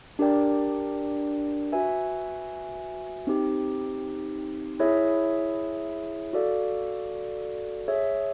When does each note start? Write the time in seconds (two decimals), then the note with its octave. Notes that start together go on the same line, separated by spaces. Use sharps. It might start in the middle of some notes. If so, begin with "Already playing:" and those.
0.19 D4 G4 A#4 D5 G5
1.72 F#4 B4 E5 G#5
3.27 C4 D#4 G4
4.79 E4 G#4 C#5 E5
6.33 F#4 A4 D5 F5
7.88 G#4 C#5 E5